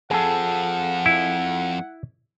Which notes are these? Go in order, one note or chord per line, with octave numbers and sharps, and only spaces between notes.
F2 F3 G#4 A4 F#5
E4